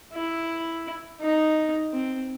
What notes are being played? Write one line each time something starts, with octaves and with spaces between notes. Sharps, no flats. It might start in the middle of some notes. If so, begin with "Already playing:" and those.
E4
D#4
C4